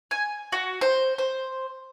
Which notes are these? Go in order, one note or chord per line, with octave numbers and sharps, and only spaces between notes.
G#5
F#4
C5
C5